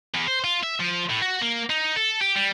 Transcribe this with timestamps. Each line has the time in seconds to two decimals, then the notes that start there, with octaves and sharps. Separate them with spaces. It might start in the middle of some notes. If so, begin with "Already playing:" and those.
0.15 E2
0.28 C5
0.44 F4
0.63 E5
0.80 F3
1.09 A2
1.22 F#4
1.42 A#3
1.70 D#4
1.96 A4
2.21 G4
2.35 G3